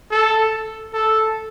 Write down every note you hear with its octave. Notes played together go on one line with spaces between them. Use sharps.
A4
A4